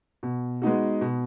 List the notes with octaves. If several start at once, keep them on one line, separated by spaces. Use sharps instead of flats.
B2
G#3 B3 D#4 F#4
B2